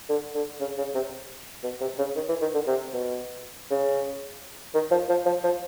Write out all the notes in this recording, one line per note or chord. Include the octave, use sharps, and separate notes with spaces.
D3
D3
C#3
C#3
C3
B2
C3
C#3
D#3
E3
D#3
D3
C3
B2
C#3
D#3
F3
F3
F3
F3